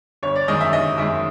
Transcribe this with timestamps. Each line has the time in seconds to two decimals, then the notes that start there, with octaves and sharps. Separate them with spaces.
0.23 G1 C#5
0.36 D5
0.48 F#2 D#3 G#3 D#5
0.61 E5
0.73 G1 D#5
0.97 F#2 D#3 G#3 E5